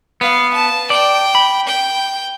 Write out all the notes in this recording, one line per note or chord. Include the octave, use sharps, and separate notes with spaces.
B3 F5
A5
D5 G5
B5
G5